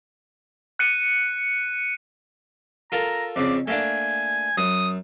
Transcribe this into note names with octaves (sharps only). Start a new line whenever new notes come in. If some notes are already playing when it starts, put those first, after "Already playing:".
F#6 C#7 D#7
F4 A4 A#4 A#5
F2 C#3 D5
A3 A#3 D4 G#5
F#2 D#6